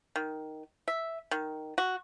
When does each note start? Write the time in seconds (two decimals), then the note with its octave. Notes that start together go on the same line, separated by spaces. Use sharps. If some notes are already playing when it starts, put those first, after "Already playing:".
0.16 D#3
0.88 E5
1.31 D#3
1.78 F#4